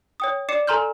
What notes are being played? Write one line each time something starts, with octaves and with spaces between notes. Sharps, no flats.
C#5 G5 D#6
D5 D6 C7 C#7 E7
A4 G#5 A#5 C6 F6 G6